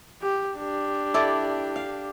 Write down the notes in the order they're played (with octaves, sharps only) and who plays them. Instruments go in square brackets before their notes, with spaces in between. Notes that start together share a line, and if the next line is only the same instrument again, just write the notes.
[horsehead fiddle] G4
D4 G4
[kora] E4 A4 D5
F5